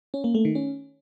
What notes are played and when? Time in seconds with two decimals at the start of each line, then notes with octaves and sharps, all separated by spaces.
0.14 C#4
0.24 A#3
0.35 A3
0.45 D#3
0.55 C#4